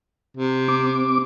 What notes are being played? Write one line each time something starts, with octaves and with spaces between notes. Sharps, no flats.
C3
C4 D6